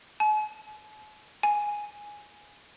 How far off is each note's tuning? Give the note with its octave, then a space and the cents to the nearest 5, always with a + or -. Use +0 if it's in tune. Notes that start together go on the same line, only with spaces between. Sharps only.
G#5 +45
G#5 +0